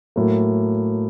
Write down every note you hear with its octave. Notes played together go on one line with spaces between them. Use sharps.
A2 F#3 A#3